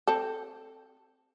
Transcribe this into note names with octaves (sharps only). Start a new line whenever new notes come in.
C4 A4